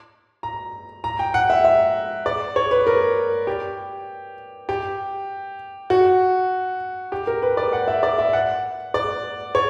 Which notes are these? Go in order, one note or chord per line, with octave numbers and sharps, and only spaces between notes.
A#5
A#5
G5
F#5
E5
E5
D5
C#5
B4
A#4
G4
G4
F#4
G4
A#4
B4
D5
F#5
E5
D5
E5
F#5
D5
C#5